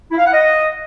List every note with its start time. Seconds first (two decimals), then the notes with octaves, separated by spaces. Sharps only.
0.11 E4
0.18 F5
0.25 F#5
0.33 D#5